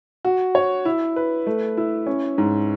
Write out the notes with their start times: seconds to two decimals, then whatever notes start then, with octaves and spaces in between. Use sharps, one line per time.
0.25 F#4
0.55 C#5
0.85 E4
1.16 B4
1.47 A3
1.77 E4
2.07 C#4
2.38 G#2